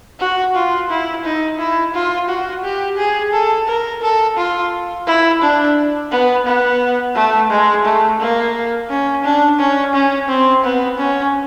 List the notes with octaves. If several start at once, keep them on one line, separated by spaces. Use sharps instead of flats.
F#4
F4
E4
D#4
E4
F4
F#4
G4
G#4
A4
A#4
A4
F4
E4
D4
B3
B3
A3
G#3
A3
A#3
C#4
D4
C#4
C#4
C4
B3
C#4